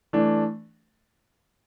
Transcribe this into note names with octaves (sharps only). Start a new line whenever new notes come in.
E3 A3 D4